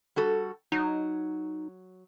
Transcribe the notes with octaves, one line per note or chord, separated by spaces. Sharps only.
G3 F#4 A4
F#3 D#4